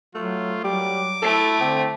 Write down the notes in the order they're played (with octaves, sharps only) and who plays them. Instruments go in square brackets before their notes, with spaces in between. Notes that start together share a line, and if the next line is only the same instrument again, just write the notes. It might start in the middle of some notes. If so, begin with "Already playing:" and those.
[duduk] F#3 [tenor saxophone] A3 [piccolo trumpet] F4
[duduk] F#3 [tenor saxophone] G3 [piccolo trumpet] D6
[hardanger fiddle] A3 [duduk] E4 [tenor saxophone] A4
[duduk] D3 [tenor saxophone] C4